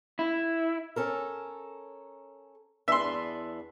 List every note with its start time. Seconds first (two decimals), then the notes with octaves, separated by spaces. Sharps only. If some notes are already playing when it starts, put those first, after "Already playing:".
0.19 E4
0.96 C#4 A4 A#4
2.88 E2 B3 D4 E5 C6